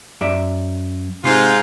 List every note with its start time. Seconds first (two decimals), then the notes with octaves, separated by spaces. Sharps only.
0.21 F#2 D5 E5
1.24 G#2 C3 F4 C6